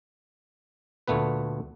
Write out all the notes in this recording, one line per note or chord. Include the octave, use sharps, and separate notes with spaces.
D2 A#2 A3 B3 B4